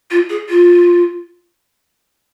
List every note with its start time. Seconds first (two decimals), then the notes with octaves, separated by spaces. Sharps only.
0.11 F4
0.30 G#4
0.49 F4